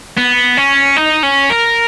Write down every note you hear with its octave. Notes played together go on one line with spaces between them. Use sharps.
B3
C#4
D#4
C#4
A#4